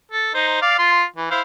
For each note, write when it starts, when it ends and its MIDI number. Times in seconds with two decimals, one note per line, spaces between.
0.12 0.30 69
0.35 0.59 63
0.35 0.59 72
0.62 0.78 74
0.62 0.78 77
0.79 1.04 65
0.79 1.04 84
1.16 1.30 52
1.31 1.41 64
1.31 1.41 72
1.31 1.41 77